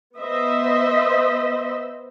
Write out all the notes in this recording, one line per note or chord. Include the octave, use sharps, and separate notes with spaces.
B3 C5 D#5 E5